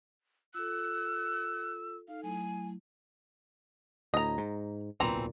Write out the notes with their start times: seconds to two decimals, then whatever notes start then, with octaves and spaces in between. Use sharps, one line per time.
0.54 F4 A4 E6 F#6
2.08 D#4 A4 F5
2.23 F#3 A3 E4 G#5
4.14 D2 A2 D#5 A#5
4.38 G#2
5.00 D1 B1 A#2 E3 C4 A#5